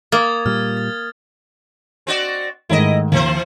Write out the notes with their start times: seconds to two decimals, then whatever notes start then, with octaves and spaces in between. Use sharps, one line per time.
0.12 A#3 D#6 G#6 A6
0.46 A#2 G3 F6
0.77 A6
2.07 C4 F#4 D5
2.69 G#2 D#3 A3 E4 D#5
3.12 D#2 E3 C4 C5